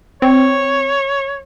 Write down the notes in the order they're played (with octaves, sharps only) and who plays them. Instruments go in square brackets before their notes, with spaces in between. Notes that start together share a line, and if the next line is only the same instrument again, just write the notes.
[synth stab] C4 [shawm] C#5